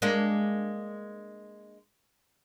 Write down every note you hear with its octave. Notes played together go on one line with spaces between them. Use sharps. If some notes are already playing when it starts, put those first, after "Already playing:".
G#3 A#3 D4